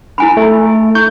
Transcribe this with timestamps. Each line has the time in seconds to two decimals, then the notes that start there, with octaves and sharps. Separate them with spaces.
0.18 E4 G#5 B5
0.37 A3
0.95 E4 C#6 G6